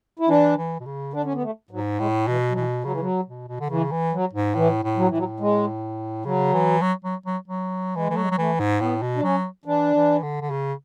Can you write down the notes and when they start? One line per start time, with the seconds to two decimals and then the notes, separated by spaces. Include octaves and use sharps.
0.19 E4
0.28 E3 D4
0.57 E3
0.80 B2
0.86 C#3
1.13 D3 D4
1.24 C#4
1.34 B3
1.42 A3
1.71 G#2 F#3
1.99 A2 G#3
2.28 B2 E3
2.50 F#3
2.55 B2 E3
2.84 C#3 F#3
2.92 E3
3.00 F#3
3.27 B2
3.48 B2
3.60 D3
3.69 C#3 E3
3.91 E3
4.12 F#3
4.33 G#2
4.55 A2 E3
4.83 A2
4.97 F#3
5.08 A2 E3
5.18 F#3
5.40 G#3
6.25 C#3 F#3
6.54 E3
6.82 F#3
7.04 F#3
7.26 F#3
7.48 F#3
7.96 E3 G#3
8.08 E3 A3
8.17 F#3
8.22 G#3
8.31 F#3
8.38 E3 A3
8.59 G#2
8.81 A2 B3
9.02 B2
9.16 D4
9.23 F#3 C#4
9.66 E3 D4
9.95 E3
10.23 D3
10.41 D3
10.51 C#3